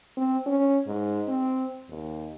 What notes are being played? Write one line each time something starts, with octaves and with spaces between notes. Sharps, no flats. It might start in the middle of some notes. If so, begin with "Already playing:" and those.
C4
C#4
G#2
C4
D#2